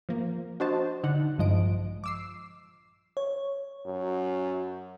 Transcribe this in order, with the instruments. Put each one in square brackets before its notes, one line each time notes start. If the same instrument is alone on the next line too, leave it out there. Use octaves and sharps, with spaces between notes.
[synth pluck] F3 A#3
D4 F#4 C5 D#5 A5
D3 D#4 F#5
A#1 G2 F3 G#3 D#5 D7
D6 E6 C7
[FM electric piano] C#5
[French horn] F#2